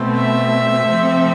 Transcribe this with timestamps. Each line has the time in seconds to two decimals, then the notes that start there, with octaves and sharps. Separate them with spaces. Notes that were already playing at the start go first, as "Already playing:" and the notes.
Already playing: B2 A3 C4
0.17 E5
0.87 C3 F3 A3 C4